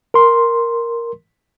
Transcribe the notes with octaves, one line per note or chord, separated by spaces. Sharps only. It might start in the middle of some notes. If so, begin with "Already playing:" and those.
A#4 C6